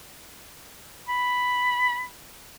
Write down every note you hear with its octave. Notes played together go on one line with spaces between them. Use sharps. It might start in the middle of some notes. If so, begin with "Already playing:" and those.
B5